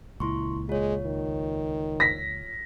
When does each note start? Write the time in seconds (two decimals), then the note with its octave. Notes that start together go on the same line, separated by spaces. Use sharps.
0.20 C#2 A#2 E4 C6 C#6
0.69 G#3 F4 C#5
1.06 D#3
2.00 A#6 B6